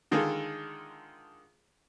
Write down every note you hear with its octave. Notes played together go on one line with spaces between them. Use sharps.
D3 D#3 G#3 F4 G#4 A4